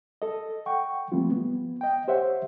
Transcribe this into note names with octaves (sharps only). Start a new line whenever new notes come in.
A4 D#5
F#5 G5 C#6
F3 G3 A3 A#3 C4 F4
B3
D#5 G5
G4 C5 C#5 E5 F#5